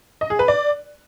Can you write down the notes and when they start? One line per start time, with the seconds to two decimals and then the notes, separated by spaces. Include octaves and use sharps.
0.21 D#5
0.30 G#4
0.39 B4
0.48 D5